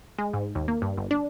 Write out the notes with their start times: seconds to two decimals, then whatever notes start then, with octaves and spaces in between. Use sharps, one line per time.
0.18 G#3
0.34 G#2
0.55 D#2
0.68 A#3
0.82 G2
0.98 G1
1.11 D4